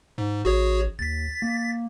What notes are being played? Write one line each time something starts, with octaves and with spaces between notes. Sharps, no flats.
G#2
A1 F#4 G#4 C#5
D#2 A6 B6
A#3